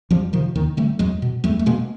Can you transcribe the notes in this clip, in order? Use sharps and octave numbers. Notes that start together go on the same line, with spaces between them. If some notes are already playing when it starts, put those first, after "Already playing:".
F2 F3 G3
C3 D#3 F3
D#2 D#3
D3 G3 A3
E2 F#3 G#3
B2
E2 G3 A3
A3
B2 G#3 A#3